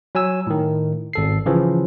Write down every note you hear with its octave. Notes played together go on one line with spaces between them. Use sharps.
F#3 G#5 E6
A2 D#3
G#1 A4 C7
C#3 E3 F3